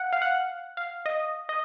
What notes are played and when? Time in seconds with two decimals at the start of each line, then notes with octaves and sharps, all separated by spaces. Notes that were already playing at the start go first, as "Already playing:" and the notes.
Already playing: F5 F#5
0.13 F5
0.22 F#5
0.77 F5
1.06 D#5
1.49 D#5